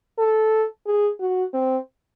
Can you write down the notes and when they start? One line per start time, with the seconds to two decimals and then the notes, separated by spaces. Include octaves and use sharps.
0.18 A4
0.86 G#4
1.20 F#4
1.53 C4